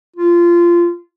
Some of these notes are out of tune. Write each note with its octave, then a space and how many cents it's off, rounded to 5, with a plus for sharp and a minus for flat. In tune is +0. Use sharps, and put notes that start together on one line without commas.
F4 -20